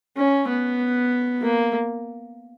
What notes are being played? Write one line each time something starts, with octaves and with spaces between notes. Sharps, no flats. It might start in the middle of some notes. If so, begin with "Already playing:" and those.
C#4
B3
A#3